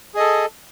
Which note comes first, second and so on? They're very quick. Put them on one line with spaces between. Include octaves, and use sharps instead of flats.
G#4 D#5 A4